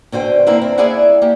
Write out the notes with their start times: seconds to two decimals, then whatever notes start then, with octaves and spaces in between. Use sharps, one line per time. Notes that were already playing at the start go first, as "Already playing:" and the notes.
0.12 B2 D3 C5 G5
0.47 D3 A#3 C4 E4
0.61 C4
0.78 A#3 E4 G#4 D5 E5 F#5
1.22 A#3 G4